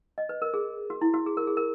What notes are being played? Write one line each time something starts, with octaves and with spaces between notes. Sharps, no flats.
D#5
B4
A#4
G#4
F#4
E4
F#4
G#4
A#4
G#4
A#4